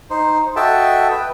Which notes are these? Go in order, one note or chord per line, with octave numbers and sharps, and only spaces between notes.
D#4 C5
F#4 A4 D#5 E5 G5 A5
B4 G5